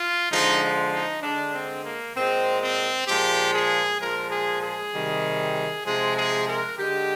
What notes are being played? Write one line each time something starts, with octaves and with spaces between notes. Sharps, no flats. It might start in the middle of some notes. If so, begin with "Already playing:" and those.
Already playing: F4
D3 F3 G#3 D#4
D#4
D3 G#3 D4
C4
A#3
A#2 G#3 C4
C4
A#2 F3 G#3 G4
G#4
A#2 F3 G#3 A#4
G#4
G#4
C3 D#3 G3
C3 F3 G#3 G#4
G#4
A#4
D3 G#3 G4